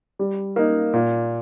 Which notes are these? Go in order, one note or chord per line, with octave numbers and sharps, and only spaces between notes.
G3
A#3 D#4
A#2